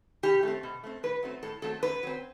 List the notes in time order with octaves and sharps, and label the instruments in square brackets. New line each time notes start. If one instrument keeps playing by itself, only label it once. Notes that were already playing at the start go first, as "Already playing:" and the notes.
[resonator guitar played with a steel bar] B2 G4
A3 C4
B2
A3 C4
A2 B4
F#3 A3 C4
A2 A4
F#3 A3 C4 A4
F#2 B4
F#3 C4